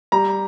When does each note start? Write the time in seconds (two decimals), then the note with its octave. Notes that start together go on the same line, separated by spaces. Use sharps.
0.12 G3 A#5